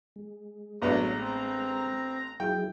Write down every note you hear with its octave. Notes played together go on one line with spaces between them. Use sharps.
G#3
A1 F#3 B3 D4 A#5
C4
F#3 E4 G#4 G5